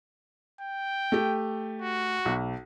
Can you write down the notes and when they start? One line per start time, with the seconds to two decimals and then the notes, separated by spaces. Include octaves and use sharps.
0.61 G5
1.12 A3 G4
1.82 F#4
2.25 B1